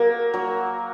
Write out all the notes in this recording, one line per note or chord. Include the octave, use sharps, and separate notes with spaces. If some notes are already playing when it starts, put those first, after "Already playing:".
Already playing: F#3 A#3
F#3